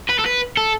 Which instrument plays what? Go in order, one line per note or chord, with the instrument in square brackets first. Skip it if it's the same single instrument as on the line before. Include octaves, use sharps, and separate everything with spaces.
[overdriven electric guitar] B4
A4
B4
A4